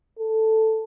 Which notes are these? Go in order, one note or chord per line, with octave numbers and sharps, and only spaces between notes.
A4